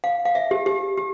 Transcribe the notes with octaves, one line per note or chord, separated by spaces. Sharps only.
F5
F5
E5
G4
G4
G4